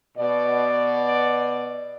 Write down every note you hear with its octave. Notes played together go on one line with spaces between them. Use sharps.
B2 D5